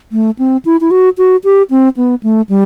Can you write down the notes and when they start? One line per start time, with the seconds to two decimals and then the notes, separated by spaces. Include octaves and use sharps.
0.12 A3
0.39 C4
0.65 E4
0.81 E4
0.91 F#4
1.18 F#4
1.44 G4
1.71 C4
1.97 B3
2.23 A3
2.49 G3